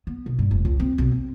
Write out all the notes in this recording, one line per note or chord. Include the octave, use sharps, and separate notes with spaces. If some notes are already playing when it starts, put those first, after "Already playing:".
B3
B1
G2
F1
C#2
C4
B1
C4